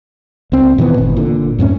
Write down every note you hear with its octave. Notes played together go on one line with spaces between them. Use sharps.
C#2 C4
A#2 D#3 E3 B3
G1
A#2 D3
F#2 A2 B3 C#4